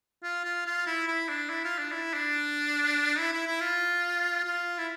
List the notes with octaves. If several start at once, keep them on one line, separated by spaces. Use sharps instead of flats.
F4
F4
F4
E4
E4
D4
E4
F4
D4
E4
D4
E4
E4
E4
F4
F4
E4